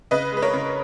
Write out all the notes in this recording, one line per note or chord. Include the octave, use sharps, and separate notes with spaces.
C#3 B4 D#5
G#3 B4
A#4 C#5
C#3